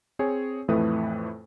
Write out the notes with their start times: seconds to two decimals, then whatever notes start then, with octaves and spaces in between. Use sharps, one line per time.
0.19 C4 G#4 C#5 G#5
0.68 F2 A2 E3 A3 B4 D#6